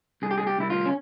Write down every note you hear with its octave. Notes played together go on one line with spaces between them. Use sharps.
C2 G#4
G4
G#4
G4
C2 E4
F4
C#4